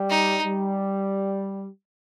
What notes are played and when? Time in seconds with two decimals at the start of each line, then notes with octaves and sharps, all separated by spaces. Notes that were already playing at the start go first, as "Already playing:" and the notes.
Already playing: G3
0.09 D#4
0.43 G3